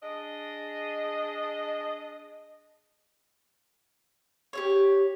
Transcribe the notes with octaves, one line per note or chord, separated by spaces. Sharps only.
D4 G#4 D#5
G4 G#4 C#5